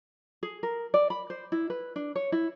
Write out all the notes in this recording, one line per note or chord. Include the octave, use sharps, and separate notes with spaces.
G#4
A#4
D5
B5
C5
E4
B4
D4
C#5
E4